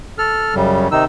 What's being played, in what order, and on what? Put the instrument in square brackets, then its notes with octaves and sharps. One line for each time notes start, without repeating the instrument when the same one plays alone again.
[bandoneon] A4 F6
F#2 C#3 G3
C3 D#3 D#4 E6